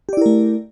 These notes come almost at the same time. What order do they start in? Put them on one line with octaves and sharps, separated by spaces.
G4 D5 E4 A#4 A3